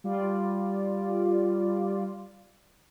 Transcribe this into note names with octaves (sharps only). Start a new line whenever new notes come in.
G3 F4 D5